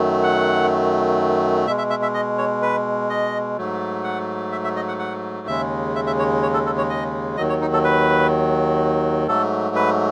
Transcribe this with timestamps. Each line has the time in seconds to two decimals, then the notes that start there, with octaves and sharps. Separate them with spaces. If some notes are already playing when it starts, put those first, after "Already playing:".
Already playing: F#2 D#3 F#3 A3
0.24 F#5
1.67 B2 G#3 E5
1.78 E5
1.90 E5
2.02 E5
2.14 D#5
2.38 C#5
2.62 B4
3.10 D#5
3.58 G#2 F#3 A3
4.04 F#5
4.52 E5
4.64 E5
4.76 D#5
4.88 F#5
4.99 F#5
5.47 D#2 C#3 G#3 E5
5.95 E5
6.07 E5
6.19 C#5
6.43 C#5
6.54 A4
6.66 A4
6.78 C#5
6.90 D#5
7.37 D#2 D#3 F#3 D#5
7.49 C#5
7.61 D#4
7.73 A4
7.84 B4
9.27 G#2 F#3 A3 A4
9.76 B4